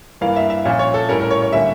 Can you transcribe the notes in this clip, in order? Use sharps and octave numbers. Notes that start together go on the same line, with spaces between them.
G2 E3 A#3 F5
E5
E5
A#2 F3 C#4
C#5
A4
A2 G3 C#4 A#4
A#4
C#5
C#5
D3 G3 A#3 C#4 E5